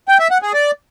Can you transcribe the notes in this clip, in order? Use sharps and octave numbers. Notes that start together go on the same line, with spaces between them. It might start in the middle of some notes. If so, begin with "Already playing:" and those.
G5
E5
F#5
G#4
D5